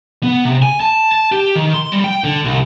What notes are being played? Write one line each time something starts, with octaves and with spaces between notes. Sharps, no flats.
B3
C3
G#5
A5
A5
G4
D#3
C6
G3
G5
D3
C2